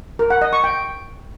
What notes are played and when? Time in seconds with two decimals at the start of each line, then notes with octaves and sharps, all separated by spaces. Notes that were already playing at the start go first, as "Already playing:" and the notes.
0.19 A#4
0.30 F#5
0.42 D#5
0.53 C#6
0.64 G5